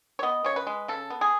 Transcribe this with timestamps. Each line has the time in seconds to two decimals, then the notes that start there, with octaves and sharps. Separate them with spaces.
0.19 C#5
0.23 B3 D#5
0.44 C#3 C#5
0.56 B4
0.67 G#3
0.88 C#3 A4
1.10 B3
1.21 G#4